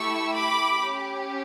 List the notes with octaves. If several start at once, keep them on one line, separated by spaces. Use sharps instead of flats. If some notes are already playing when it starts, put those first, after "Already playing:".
Already playing: A3 E4 G4 C#6 E6
B5 D6
C#4 G4